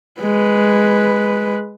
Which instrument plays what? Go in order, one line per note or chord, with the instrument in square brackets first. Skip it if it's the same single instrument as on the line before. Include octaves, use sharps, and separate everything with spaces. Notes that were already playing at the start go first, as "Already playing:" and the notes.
[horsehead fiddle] G#3 B4